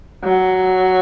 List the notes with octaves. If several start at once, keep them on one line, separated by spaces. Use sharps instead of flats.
F#3